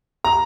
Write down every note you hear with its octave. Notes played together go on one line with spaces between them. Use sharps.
A#5